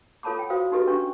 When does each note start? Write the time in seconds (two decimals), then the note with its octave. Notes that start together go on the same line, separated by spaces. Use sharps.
0.23 F4 A4 C#5 A5 B5 D6
0.39 G5
0.50 F4 F#4 C5 F5 D#6
0.72 D#4 F#4 G4 A4 B4 D#5
0.87 C#4 D4 C#6